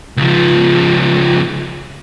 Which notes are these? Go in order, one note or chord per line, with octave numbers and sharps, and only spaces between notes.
C#2 F3